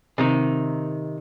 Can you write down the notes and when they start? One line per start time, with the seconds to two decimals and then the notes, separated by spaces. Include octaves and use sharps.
0.18 C3 D#3 D#4